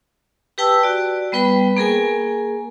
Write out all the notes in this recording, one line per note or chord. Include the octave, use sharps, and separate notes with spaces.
G4 B4 G5 A5 E6
F#4 D5
G3 B3 B4 G5 B5
A#3 G#4 A#4 G#5